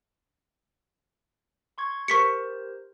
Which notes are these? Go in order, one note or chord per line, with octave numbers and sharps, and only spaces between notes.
C6 C#6 G#6
G4 A#4 C5 C#6 B6 C#7